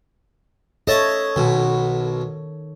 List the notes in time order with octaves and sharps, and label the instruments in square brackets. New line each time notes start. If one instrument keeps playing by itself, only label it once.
[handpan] A4 C#5 [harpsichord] D#5 E5 A5
[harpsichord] B1 B2 [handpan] D#3